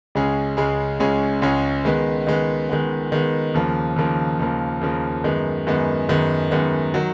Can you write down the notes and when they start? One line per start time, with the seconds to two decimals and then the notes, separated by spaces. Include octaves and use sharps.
0.15 C#2 C#3 G#3 C#4 G#4
0.57 C#2 C#3 G#3 C#4 G#4
1.00 C#2 C#3 G#3 C#4 G#4
1.42 C#2 C#3 G#3 C#4 G#4
1.85 D#3 G#3 B3
2.27 D#3 G#3 B3
2.69 D#3 G#3 B3
3.12 D#3 G#3 B3
3.54 D#2 C#3 F3 A#3
3.96 D#2 C#3 F3 A#3
4.39 D#2 C#3 F3 A#3
4.81 D#2 C#3 F3 A#3
5.24 F#2 D#3 G#3 B3
5.67 F#2 D#3 G#3 B3
6.09 F#2 D#3 G#3 B3
6.51 F#2 D#3 G#3 B3
6.94 D#3 F#3